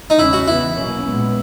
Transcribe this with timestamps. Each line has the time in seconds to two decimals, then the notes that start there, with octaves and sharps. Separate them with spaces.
0.10 D#4
0.19 E2 C#3 G#3 C#4 E4
0.33 F#4
0.48 C#3 E3 B3 E4
0.75 B2 F#3 A#3 C#4
1.04 A#2 G#3 B3